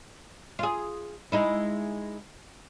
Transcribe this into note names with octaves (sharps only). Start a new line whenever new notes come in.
F4 G#4
G#3 D#4 E4